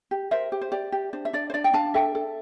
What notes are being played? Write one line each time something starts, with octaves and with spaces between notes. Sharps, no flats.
G4
A#4 C5 E5
G4
C5
G4 D5
G4
D4 C5
E5
D4 D5
C5
D4 D5
G5
D4 F5 A5
A4 E5 G5
A4